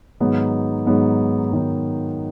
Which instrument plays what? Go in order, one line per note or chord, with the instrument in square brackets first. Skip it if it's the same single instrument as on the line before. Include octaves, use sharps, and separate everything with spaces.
[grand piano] G#2 D#3 F#3 B3 D#4
G#2 D#3 F#3 B3 D#4
G#2 D#3 F#3 B3 D#4